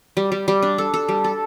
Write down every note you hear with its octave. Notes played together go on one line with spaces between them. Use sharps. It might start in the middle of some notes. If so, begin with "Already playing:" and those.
G3
G3
G3
D4
A4
A4
G3
A4